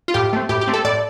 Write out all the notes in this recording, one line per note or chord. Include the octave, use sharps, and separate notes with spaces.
F4
A2 G4
A3 C4
A2 G4
G4
A3 C4
A4
A2 D5